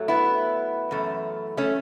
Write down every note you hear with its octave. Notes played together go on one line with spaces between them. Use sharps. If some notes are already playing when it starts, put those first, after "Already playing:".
Already playing: F#2 F#3 A3
B3 E4
F#2 E3 A3
A3 C#4